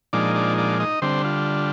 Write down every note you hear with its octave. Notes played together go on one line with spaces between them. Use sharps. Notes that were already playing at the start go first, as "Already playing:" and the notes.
A#2 F3 G#3 D4 D#4 D5
D4 D5
D4 D5
D#4 D#5
D3 G3 C4 D4 C5
F4